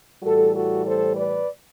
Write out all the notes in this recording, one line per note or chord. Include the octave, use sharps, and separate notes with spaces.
A2 E3 G3 F#4 A4
F#4 A4
A4 C5
B4 D5